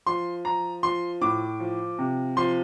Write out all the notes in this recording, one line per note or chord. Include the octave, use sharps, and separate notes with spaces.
F3 C6
F3 A#5
F3 C6
A2 D6
F3
C3
F3 C6